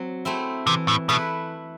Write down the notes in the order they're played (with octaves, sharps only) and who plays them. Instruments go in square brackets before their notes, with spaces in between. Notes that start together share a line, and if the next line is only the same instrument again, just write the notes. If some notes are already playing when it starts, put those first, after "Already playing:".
Already playing: [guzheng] F#3 C4
A3 C4 E4
[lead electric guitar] C3 [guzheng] E3
[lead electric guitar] A2
[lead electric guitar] B2 [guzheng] A3 E4 B4